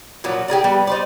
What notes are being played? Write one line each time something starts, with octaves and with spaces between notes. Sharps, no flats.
A#2 F3 F#3
G4 G#4 A#4 D5
G3 B3
D#4 C5 D5